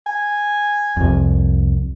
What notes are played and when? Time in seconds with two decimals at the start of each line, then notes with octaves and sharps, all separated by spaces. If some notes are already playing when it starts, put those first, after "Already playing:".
0.06 G#5
0.97 C2 F2